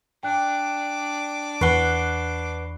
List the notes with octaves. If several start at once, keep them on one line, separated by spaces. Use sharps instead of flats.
D4 G5 D6 F#6
E2 B4 F#5 C#6 C7 G7